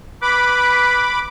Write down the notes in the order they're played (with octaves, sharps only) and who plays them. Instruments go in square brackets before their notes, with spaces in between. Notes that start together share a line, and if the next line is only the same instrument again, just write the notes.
[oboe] B4 [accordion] B5 D6